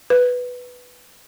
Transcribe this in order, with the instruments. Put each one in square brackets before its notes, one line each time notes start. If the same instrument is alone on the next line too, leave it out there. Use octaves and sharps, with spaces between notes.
[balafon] B4